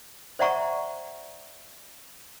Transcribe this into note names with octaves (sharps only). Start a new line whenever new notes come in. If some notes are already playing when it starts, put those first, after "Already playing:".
C5 D5 E5 F#5 A#5 C#6